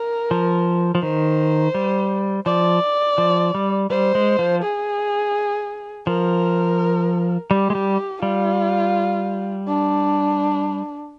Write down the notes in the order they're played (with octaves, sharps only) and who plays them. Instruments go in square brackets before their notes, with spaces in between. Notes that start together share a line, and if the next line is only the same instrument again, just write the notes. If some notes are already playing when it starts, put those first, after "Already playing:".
Already playing: [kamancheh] A#4
[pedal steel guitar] F3
F3
[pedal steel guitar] D#3 [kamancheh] C5
[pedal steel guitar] G3
[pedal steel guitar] F3 [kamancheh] D5
[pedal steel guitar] F3
G3
[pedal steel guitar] G3 [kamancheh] C5
[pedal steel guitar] G#3
F3
[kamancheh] G#4
[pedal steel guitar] F3 [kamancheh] A#4
[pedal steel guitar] G3 [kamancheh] G4
[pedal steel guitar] G#3
G3
[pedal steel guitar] G3 [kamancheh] F4
[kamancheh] D4